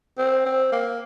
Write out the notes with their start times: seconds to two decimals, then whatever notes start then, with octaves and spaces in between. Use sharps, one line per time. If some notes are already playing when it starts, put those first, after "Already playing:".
0.18 C4
0.46 C4
0.72 A#3